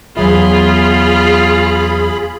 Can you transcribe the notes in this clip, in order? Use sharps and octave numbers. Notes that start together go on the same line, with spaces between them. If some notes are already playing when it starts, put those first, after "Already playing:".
E2 F#3 F4 G#4 E5 B5